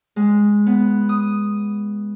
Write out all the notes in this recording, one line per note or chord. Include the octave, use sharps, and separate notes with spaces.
G#3
B3
D#6